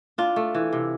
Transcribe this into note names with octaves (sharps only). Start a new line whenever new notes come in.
D4 F4
A3
E3
C3